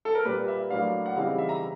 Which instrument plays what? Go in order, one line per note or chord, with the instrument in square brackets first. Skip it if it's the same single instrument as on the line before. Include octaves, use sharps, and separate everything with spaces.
[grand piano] A4
A#4
A#2 G3 A#3 B4
E5
A2 F#3 A#3 D4 F5
F#5
C#3 E3 G3 C4 D#4 F5
E5
A#5